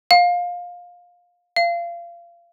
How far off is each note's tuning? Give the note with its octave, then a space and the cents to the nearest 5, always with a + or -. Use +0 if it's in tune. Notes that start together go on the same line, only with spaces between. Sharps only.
F5 +20
F5 -25